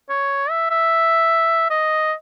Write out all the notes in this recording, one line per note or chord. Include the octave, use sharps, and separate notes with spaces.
C#5
E5
E5
D#5